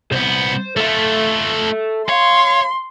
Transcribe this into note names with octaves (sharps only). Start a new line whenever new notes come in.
C2 B3 C5
A3 F4 A4 E5
C#5 F5 C6